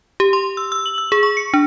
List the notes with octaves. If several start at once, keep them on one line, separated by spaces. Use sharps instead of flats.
G4
C6
E6
E6
F#7
E6
G#4
C#6
C#7
D4